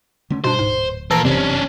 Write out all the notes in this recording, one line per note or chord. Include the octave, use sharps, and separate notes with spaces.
D3 A3 C#4
G2 B2 D4 C5
D1 G#2
A#2 E3 F3 A#3 A4 A#5
G1 F#2 C3 C#4 D4